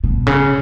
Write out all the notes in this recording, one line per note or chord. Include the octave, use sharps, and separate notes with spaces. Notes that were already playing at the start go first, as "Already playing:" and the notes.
B2
C#3